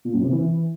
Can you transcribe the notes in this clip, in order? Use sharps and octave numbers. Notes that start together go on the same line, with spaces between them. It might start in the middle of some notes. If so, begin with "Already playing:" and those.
A#2
F#2
C3
E3